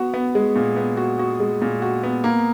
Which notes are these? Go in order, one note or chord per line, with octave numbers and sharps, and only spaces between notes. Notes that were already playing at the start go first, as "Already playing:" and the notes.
Already playing: B3 F#4
B3
G#3
A#2
B3
F#4
F#4
G#3
A#2
F#4
B3
A#3